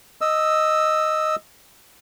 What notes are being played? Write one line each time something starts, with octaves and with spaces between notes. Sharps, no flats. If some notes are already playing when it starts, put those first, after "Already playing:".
D#5 E6